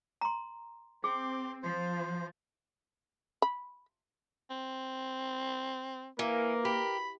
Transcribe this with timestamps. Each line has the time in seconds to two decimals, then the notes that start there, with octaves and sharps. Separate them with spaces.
0.21 A#5 C6
1.04 C4 G#4 C6 D6
1.62 F3 C5
3.42 B5
4.50 C4
6.19 E3 A#3 A#4
6.65 G4 B5